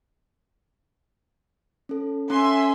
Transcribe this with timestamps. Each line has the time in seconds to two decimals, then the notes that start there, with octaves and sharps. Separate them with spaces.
1.89 C#4 A4
2.30 C#4 A4 E5 G#5 C6